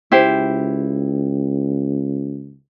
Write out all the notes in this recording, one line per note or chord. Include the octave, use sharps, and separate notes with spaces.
C#2 E4 G4 C5